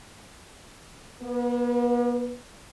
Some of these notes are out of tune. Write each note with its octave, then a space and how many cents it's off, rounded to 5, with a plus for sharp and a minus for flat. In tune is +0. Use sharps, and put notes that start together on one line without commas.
B3 -45 B4 +0